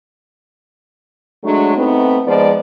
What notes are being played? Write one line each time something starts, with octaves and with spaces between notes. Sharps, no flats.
F#3 G#3 A3 D4
A3 B3 C4 D#4
F3 G#3 B3 D#4 D5